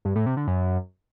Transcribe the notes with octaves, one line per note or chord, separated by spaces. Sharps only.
G2
A2
C3
D3
F#2